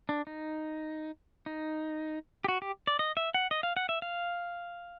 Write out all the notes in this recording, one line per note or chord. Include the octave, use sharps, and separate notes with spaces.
D4
D#4
D#4
G4
F#4
G4
D5
D#5
E5
F#5
D#5
F5
F#5
E5
F5